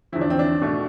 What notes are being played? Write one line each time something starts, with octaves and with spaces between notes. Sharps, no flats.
E2 D3 F3 E4
D4
C4
D4
B2 A3